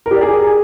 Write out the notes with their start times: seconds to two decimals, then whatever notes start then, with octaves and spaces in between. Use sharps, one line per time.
0.06 A#4
0.11 G4
0.16 D5
0.21 G#4